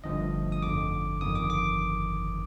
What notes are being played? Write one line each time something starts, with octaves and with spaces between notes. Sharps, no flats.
G1 G2 D3 F3 A3 D#5
D#6
G1 F2 D3 D6
G1 F2 D#3 D#6
D6
D6